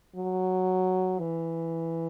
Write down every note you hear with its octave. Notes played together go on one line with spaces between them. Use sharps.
F#3
E3